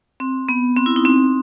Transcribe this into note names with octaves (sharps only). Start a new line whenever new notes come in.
C4
B3
C4
E4
D#4
C4